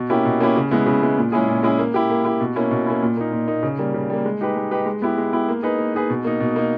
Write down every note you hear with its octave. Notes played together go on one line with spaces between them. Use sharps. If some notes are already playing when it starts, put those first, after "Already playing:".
Already playing: B2
A#3 C#4 E4 G4
B2
A#3 C#4 E4 G4
C#3
G#3 B3 E4
C#3
G#3 B3 E4
A#2
G#3 C#4 E4 G#4
A#2
G#3 C#4 E4 G#4
A#3
E4 G4
A#3
E4 G4
B2
A#3 C#4 E4
B2
A#3 C#4 E4
A#2
A#3 D#4
A#2
A#3 D#4
C#3
G3 A#3
C#3
G3 A#3
G#3
D#4 G4 B4
G#3
D#4 G4 B4
G#3
B3 E4 G4
G#3
B3 E4 G4
A#3
D#4 G#4 B4
A#3
D#4 G#4 B4
B2
A#3 D#4
B2
A#3 D#4